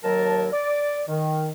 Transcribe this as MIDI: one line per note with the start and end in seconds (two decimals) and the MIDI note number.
0.03 0.47 39
0.03 0.47 54
0.03 0.47 70
0.03 0.47 81
0.53 1.02 74
1.08 1.51 51